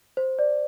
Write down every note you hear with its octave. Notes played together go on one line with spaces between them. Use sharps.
C5
D5